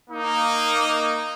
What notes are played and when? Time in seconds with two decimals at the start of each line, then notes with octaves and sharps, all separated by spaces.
0.10 A#3 D#4